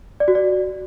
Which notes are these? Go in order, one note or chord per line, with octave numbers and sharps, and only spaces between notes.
D5
F#4
D5